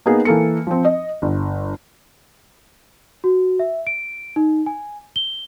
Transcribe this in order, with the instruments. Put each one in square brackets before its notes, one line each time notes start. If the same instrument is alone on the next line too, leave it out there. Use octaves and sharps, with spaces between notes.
[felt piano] A#3 B3 D#4 G#4
E3 A#3 A4 C#7
F3 C4
D#5
G1
[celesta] F#4
E5
D7
D#4
G#5
G7